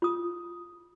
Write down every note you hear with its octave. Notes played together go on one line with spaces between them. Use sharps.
F4 D#6